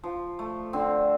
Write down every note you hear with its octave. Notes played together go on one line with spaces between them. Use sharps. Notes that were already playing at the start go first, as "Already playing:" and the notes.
F3
A3
D3 C4